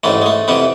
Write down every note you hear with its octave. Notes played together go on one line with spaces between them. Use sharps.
A1 G#2 E3 A3
G#3
A3
F2 C3 E3 B3